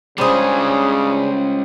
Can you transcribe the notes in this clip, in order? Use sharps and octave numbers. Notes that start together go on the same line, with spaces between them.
C#3 G3 G#3 C#4 D4 G#4 C5